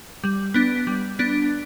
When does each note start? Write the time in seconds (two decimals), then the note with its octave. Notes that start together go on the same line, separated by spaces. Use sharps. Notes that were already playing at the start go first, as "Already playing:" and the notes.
0.24 G3
0.54 B3 D4
0.87 G3
1.19 B3 D4